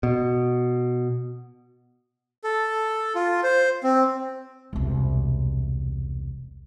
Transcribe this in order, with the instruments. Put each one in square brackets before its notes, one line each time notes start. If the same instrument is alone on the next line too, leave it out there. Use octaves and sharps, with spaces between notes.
[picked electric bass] B2
[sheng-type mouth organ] A4
F4
C5
C4
[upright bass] E1 C2